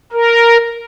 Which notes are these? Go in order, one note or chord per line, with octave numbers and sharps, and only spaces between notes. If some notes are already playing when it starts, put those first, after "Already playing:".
A#4